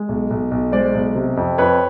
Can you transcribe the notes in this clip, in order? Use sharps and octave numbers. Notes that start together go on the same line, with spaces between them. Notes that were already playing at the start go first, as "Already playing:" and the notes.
Already playing: G#3
B1
B1
B1
G#3 C5 D5
B1
C3
F2
F2 B4 C#5